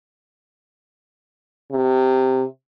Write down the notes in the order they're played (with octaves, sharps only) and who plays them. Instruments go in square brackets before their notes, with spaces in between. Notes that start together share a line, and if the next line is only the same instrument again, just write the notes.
[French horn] C3